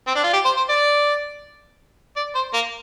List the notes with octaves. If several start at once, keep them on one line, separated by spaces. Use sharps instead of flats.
C4
D4
F4
G4
C5
C5
D5
D5
C5
A#3